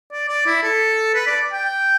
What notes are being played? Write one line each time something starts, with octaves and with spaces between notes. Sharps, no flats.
D5
D5
E4
A4
B4
D5
G5